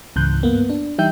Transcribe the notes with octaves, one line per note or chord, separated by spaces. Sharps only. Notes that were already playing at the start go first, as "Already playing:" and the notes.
C#2 G#2 C#3 E3 F#6 G6
G2 A#3 B3
D4
E3 G3 D#4 E5 G5 G6